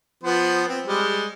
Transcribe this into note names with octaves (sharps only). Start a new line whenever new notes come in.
F3 B3 C5
C4
G3 G#3